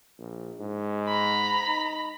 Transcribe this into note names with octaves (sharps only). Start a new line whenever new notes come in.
A#1
G#2
A#5 B5
D#4